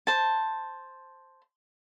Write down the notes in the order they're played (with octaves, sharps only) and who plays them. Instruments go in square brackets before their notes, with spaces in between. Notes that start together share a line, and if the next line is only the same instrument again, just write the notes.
[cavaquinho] C5 A5